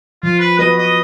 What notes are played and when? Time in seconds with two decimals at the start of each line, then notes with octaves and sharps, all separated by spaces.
0.23 F3 F4
0.39 B4
0.59 F#4 B4 D#5
0.78 D#5